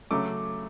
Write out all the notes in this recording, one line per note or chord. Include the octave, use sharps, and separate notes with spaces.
C#3 F#3 A3 D6